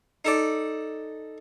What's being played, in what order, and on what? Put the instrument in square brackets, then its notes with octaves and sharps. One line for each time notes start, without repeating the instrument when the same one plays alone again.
[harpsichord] D#4 A4 D5